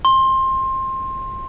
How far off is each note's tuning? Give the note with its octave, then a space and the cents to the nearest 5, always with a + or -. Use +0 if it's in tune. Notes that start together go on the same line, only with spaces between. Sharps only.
C6 +20